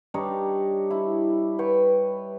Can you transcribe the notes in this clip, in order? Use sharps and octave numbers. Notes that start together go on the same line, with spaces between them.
G3 D4 D#4 C#5
E4
B4 C#5 G5 C#6